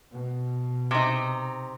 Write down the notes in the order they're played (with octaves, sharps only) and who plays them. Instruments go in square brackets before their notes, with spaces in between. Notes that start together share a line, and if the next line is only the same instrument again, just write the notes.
[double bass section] B2
[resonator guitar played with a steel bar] C3 D#4